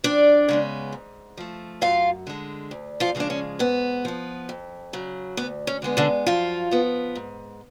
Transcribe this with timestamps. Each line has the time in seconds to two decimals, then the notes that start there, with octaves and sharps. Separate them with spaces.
0.04 F2 D4 D5
0.48 C#3 G#3 B3
0.92 G#2
1.37 F3 A3
1.81 F#2 F4 F5
2.27 D3 G#3
2.71 D2
3.00 F3 F4
3.15 C#3 F3 G#3 B3
3.20 D4
3.30 C#4
3.59 G#2 B3
4.05 F3 B3
4.49 F2
4.93 C#3 F#3
5.37 D2 B3
5.67 C#4
5.82 D3 G#3 B3
5.97 D3 D4
6.27 F#2 F3 F4
6.71 F3 B3
7.15 G#2